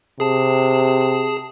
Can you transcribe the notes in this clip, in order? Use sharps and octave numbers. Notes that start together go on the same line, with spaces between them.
C3 G#4 A5